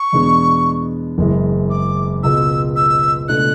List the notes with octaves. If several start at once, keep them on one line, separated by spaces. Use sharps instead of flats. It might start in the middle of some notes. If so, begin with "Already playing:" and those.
Already playing: C#6
E2 B2 G#3 B3 D4
F#1 F#2 E3 G#3
D6
C#2 B2 G#3 E6
E6
C#2 B2 A3 D4 F#6